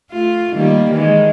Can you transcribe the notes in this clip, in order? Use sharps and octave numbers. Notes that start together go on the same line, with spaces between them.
A3 F4
D#3 G3 A#3
D#3 E3 G#3